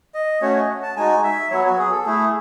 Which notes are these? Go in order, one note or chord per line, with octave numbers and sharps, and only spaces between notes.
D#5
A3 C#4 F#4 C#5
D#5
F#5
A5
G#3 D#4 F#4 G#5
E5
F#3 B3 F#4 C#5
F#4
G#4
A4
A3 E4 G#4